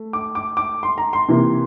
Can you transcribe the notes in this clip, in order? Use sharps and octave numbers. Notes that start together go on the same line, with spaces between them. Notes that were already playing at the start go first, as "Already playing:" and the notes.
Already playing: A3
D6
D6
D6
C6
A#5
C6
C3 E3 A#3